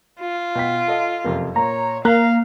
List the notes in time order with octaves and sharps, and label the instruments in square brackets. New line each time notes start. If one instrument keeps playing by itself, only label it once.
[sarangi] F4
[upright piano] B2 G5 B6
A4 D#5 F5
F#1 F2 C3
[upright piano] A#2 [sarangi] C#5 [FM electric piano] A#5
[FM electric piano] A#3 [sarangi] F5 [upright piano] A#5 F#6 B6